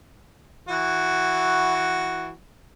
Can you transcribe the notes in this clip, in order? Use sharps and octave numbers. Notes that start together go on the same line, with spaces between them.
E3 F#4